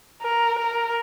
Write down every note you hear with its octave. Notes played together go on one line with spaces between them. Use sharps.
A#4
A#4